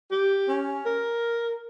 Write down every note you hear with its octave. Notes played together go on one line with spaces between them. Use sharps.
G4
C#4
A#4